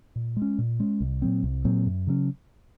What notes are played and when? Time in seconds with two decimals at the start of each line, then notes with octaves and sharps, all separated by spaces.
0.16 A#2
0.37 G#3
0.42 C#4
0.58 A#2
0.80 G#3 C#4
1.00 C2
1.22 A#2 F#3 C4
1.43 C2
1.65 A#2 F#3 C4
1.86 F#2
2.07 C#3 F#3 C#4